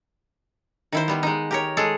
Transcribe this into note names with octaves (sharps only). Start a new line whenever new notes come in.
D#3 E4 C5
G3 B3
G#3 D#4
G4 A#4 C#5
G#3 G#4 A4